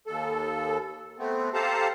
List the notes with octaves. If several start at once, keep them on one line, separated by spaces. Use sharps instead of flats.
D#2 A4
A3 B3 C4
G4 A4 C5 F5 A5 A#5